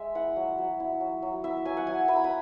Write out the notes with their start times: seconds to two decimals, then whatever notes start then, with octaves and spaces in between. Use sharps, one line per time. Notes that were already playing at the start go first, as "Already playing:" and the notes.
Already playing: G#3 E5
0.15 E4 F#5
0.36 F#3
0.58 F#3
0.80 E4
1.01 F#3
1.22 F#3
1.44 E4 E5
1.65 F#3 G#5
1.77 F#5
1.87 F#3 G#5
2.08 E4 B5
2.16 A#5
2.24 B5